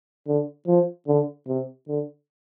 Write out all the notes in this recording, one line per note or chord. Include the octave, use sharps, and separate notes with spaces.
D3
F3
D3
C3
D3